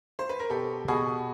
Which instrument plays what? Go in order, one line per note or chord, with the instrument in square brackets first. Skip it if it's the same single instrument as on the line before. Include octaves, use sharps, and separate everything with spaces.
[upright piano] C5
B4
A#4
[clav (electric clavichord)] B2 [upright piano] G4 A4
[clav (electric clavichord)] B2 [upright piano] F#4 G#4